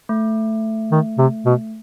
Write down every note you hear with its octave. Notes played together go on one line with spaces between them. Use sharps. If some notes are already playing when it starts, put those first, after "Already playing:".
A3
D#3
C3
B2